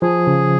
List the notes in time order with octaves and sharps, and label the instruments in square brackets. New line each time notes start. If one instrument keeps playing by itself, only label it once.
[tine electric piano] F3 [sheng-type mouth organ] G#4
[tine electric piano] C#3